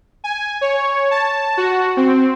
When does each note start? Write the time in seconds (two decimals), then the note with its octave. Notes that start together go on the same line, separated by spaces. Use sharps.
0.24 G#5
0.61 C#5
1.11 A5
1.57 F#4
1.97 C4